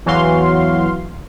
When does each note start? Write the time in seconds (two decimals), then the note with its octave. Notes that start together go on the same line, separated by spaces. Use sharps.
0.06 E2 E3 F#3 F#4 F5 C6